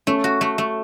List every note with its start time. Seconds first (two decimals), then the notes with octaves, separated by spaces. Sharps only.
0.07 A3 C#4
0.24 F#4
0.41 A3
0.58 A3